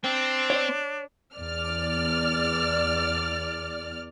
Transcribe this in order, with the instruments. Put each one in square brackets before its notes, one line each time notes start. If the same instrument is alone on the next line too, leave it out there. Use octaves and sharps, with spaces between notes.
[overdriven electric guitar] C4 [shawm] D4
[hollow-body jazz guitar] C#5 D5
[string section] E2 D5 F6